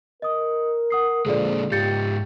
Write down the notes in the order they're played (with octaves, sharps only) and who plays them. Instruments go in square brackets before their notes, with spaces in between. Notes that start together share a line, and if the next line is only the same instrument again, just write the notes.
[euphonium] A#4 [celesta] D#5 D#6
[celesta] F#5 D#6 C7
[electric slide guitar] A#2 D3 G#3 [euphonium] F3 [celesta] G#4 A4 D5
[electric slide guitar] G#2 F4 [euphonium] G4 [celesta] G6 A6 C#7